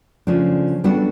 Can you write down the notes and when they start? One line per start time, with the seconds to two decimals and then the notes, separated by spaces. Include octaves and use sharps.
0.27 C#3 F3 A3 D4
0.84 G3 B3 D4 F#4 A4